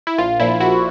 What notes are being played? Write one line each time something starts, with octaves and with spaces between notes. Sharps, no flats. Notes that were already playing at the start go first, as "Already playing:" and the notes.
E4
A#1 F4
A#2 F3 E4
A#1 E4 F#4